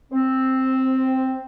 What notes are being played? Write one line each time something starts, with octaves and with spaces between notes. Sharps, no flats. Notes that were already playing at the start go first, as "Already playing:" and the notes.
C4